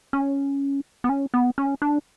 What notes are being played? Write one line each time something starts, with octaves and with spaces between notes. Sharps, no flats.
C#4
B3
C#4
B3
C#4
D4